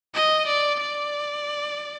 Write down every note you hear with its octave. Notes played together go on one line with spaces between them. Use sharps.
D#5
D5
D5